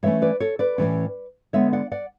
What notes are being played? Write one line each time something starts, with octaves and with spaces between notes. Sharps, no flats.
A2 E3 A3 C#4 C#5 E5
B4 D5
A4 C#5
B4 D5
A2 E3 A3 C#4
D3 G#3 B3 C#5 E5
D5 F#5
D5 F#5